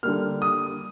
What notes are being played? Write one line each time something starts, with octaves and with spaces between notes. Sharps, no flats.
D3 G3 A#3 F6
D#6